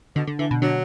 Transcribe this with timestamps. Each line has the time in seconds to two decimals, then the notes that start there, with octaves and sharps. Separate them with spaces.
0.16 B2 D3
0.27 D3
0.39 D3 E3
0.51 B2
0.62 D3 F#3